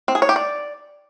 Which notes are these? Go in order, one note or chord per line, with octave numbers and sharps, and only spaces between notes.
C4
G#4
C#5
G4
D5